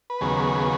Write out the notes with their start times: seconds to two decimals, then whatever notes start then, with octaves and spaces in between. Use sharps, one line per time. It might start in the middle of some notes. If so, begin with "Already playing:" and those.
0.10 B4
0.21 D#2 C#3 F#3 B3 G#4